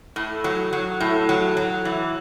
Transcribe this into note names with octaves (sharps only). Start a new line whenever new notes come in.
A2
F#3
F#3
A2
F#3
F#3
E3